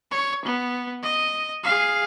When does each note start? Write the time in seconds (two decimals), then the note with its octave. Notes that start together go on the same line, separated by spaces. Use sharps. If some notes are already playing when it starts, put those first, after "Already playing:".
0.11 C#5
0.45 B3
1.03 D#5
1.64 G#4 F5